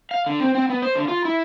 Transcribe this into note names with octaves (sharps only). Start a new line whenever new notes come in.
F5
D3
C4
C4
B3
C5
D3
F4
E4